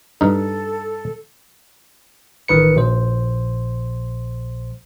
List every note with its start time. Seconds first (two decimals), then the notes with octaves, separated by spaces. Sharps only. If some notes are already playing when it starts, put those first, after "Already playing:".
0.21 G2 D#4 A4
2.48 A1 D#3 B4 C#7
2.76 A#1 C5